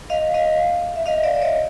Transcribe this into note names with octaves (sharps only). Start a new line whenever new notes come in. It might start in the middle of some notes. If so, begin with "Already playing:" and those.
D#5 F5
D#5 F5
E5
D#5 F5
D5 E5
C#5 D#5